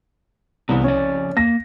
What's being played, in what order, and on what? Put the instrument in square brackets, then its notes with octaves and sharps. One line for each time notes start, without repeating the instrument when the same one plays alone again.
[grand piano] C2 [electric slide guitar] B2 E3 B3
[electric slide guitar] F2 C#3 D5 [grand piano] C#4
[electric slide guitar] A#3 [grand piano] A#6